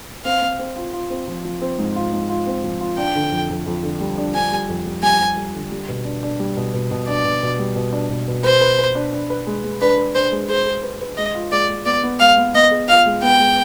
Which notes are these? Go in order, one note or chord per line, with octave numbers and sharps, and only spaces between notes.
C4 F5
C4
C4
F4
F4
C4
F3
F3
C4
G#2
F4
G#2
F4
C4
F3
F4
D4 G5
D3
F2
F2
F2
D3
G3
D4
D4 G#5
G3
F2
G3
G3 G#5
G3
G3
D3
G3
B2
D4
D4
G3
B2
B2
B2
D4 D5
B2
B2
G3
B2
D4
B2
B2
B4 C5
B4
B4
D4
D4
B4
G#3
G#3
D4 B4
B4
D4 C5
G#3
G#4 C5
G#4
B4
B4
G#3 D#5
F4
G#3 D5
G#3
B3 D5
B3
G#3 F5
B3
B3 D#5
G#4
F4 F5
G#3
B3 G5
G#3